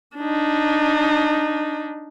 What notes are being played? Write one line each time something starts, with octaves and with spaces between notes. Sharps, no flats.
D4 D#4